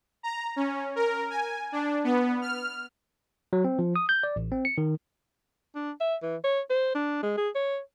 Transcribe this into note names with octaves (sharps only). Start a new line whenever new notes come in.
A#5
C#4
A#4
G#5
D4
B3
F6
F#3
C4
F3
D#6
G6
D5
A1
C4
C#7
D#3
D4
E5
E3
C#5
C5
D4
G#3
G#4
C#5